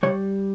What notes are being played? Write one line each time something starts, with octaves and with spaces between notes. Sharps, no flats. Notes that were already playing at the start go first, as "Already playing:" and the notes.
C#3 G3 C#5